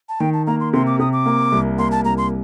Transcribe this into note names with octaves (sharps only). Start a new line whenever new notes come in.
A5
D#3 G5
A5
A#3 A#5
C6
C3 C6
D6
C3 D#6
D6
A#3
C2
A#3 C6
A5
C2 A#5
C6